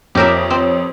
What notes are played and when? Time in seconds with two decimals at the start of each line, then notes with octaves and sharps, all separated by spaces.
0.15 F2 G4 A#4 C#5 E5 D6
0.50 C4